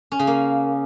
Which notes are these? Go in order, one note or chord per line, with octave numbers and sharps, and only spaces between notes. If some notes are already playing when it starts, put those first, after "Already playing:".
C#4
C#3
A#3